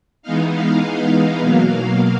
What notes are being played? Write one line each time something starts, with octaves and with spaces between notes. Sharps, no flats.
E3 G#3 B3 D#4 F5
F5
F5
B2 F#3 A#3 F5